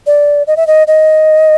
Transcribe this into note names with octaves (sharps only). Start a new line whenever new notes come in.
D5
D#5
E5
D#5
D#5